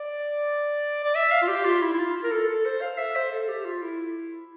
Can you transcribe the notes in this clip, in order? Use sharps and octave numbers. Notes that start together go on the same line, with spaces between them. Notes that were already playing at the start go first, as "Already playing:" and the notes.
Already playing: D5
D5
E5
F5
F4
G4
F4
E4
E4
F4
A#4
A4
A4
C5
F5
E5
C5
A4
G4
F4
E4